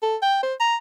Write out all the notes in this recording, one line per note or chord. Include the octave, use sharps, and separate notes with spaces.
A4
G5
C5
A#5